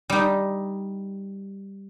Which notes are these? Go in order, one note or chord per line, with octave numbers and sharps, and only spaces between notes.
G3 D#4